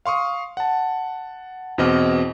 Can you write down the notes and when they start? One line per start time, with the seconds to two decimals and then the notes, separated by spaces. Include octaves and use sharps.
0.06 F5 C6 C#6 D#6
0.57 F#5 A5
1.78 E2 B2 C4 D#5 D6 F6